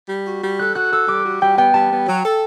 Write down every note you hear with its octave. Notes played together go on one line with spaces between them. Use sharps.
G3
F#4
G3
A4 F#6
F#4 F#6
A4 E6
G3 D6
F#4
G3 G5
B3 G5
G3 A5
B3
F#3
A4